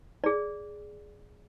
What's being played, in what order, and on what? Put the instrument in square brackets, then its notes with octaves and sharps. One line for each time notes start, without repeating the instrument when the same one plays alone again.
[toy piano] G#4 D5